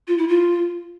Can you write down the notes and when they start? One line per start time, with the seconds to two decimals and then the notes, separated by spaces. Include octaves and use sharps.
0.07 F4
0.17 E4
0.28 F4